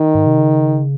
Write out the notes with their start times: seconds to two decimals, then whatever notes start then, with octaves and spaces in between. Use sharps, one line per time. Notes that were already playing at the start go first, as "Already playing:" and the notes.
Already playing: D#3
0.15 G#2
0.27 C3
0.40 C#3